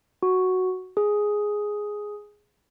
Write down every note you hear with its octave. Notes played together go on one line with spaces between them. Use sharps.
F#4
G#4